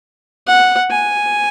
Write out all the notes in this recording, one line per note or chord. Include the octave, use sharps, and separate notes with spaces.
F#5
G#5